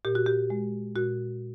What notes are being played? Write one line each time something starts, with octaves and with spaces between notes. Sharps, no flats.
A#2 G4
F#4
G4
G#3
A#2 F#4